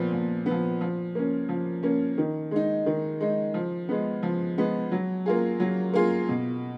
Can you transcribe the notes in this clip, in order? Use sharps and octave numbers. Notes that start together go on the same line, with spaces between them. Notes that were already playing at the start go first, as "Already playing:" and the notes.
Already playing: A#2 F3 B3
A#2
B3
F3
F3
A#3 C#4
F3
A#3 C#4
D#3
G#3 D#4
D#3
G#3 D#4
F3
G#3 B3
F3
G#3 B3
F#3
A#3 F4 G#4
F#3
A#3 F4 G#4
B2